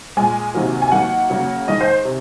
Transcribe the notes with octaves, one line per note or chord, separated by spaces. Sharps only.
A#2 G#3 G#5
C3 D#3 F#3 A#3
G#5
D#3 F#3 A#3 F#5
C#3 F#3 A#3
D#3 G#3 D#5
C5
C3